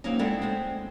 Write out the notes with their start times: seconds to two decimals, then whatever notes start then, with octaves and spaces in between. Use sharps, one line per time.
0.04 F#3 A#3 C4 C#4 D#4
0.19 G#3 C4 E4 A4 D5 F#5
0.42 G#3 C4